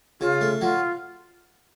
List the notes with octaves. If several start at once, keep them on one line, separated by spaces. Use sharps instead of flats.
C#3 F4
A3
F#3 F4